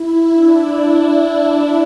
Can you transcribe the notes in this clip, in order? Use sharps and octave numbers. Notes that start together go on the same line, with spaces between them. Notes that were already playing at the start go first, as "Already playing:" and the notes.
Already playing: E4
D4
E4
E4
D4